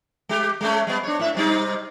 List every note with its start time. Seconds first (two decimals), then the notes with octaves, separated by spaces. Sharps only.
0.29 G#3 G4
0.61 G#3 A3 C#4
0.87 G3 B3
1.03 D4 C#5
1.20 A2 E5
1.35 C3 G3 D#4